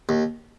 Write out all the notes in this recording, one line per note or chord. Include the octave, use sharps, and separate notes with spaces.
D#2